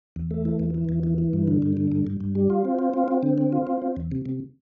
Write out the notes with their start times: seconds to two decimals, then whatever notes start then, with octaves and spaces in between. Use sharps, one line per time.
0.16 E2
0.31 A3
0.45 E3
0.59 E2
0.74 E3
0.89 E2
1.03 E3
1.18 E3
1.33 G2
1.48 D3
1.62 G2
1.77 D3
1.92 G2
2.07 G2
2.20 G2
2.35 G3
2.50 F4
2.65 C4
2.79 F4
2.94 C4
3.08 C4
3.23 D3
3.38 C4
3.52 F4
3.67 C4
3.82 C4
3.96 E2
4.12 C3
4.26 C3